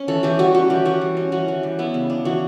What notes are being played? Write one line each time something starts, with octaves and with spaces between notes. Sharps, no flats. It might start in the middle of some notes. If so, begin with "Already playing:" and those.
Already playing: C#4
E3 A4
E3 G4
G3 F#4
C#4 F#4
E3 G4
E3 F#4
G3
C#4
E3 F#4
E3
G3
B3 E4
C#3
D4
E3 F#4